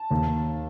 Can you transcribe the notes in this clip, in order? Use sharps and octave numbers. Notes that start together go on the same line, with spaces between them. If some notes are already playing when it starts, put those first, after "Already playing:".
Already playing: A5
D#2